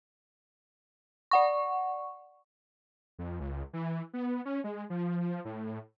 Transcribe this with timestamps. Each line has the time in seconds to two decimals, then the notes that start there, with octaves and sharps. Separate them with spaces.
1.31 D5 F#5 C#6
3.19 F2
3.40 C#2
3.73 E3
4.14 B3
4.45 C#4
4.64 G#3
4.90 F3
5.45 A2